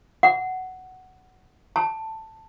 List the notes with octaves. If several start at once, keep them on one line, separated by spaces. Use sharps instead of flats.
F#5
A5